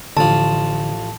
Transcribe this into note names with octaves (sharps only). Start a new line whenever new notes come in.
A1 D3 F3 A5